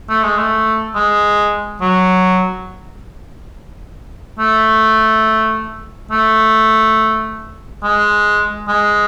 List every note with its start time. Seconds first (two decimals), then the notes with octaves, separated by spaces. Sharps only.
0.09 A3
0.23 G#3
0.38 A3
0.95 G#3
1.81 F#3
4.39 A3
6.11 A3
7.83 G#3
8.68 G#3